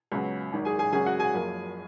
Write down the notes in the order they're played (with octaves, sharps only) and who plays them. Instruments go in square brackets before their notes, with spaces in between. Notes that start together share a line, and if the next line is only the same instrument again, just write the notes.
[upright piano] C#2 C#3 F#3 B3
G#1 F#2 D#3
G#4 G#5
G#4 G#5
G#1 F#2 C#3 F#3 C#4 G#4 G#5
F#4 F#5
G#4 G#5
F#1 F#2 F3 A#3